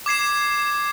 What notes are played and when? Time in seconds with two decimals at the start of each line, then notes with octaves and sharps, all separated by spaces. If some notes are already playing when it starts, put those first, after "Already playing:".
0.06 D6 G#6 C7 E7